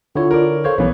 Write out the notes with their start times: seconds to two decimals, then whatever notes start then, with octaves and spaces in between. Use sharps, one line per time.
0.16 D3 E4 F4 C#5
0.31 A#4 D5
0.64 A4 C5 C#5 F5
0.78 B1 E3 B3 C#5